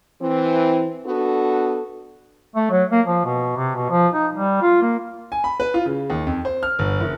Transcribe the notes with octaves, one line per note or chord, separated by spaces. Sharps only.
E3 C4
B3 D4 F#4 A4
A3
F#3
A#3
F3
B2
C3
B2
F3
D#4
G3
F4
A#3
G#5
B5
B4
F4
C#3
D#2
F2
C5
F6
G1
F#1